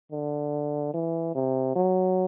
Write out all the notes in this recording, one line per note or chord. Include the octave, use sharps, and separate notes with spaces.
D3
E3
C3
F#3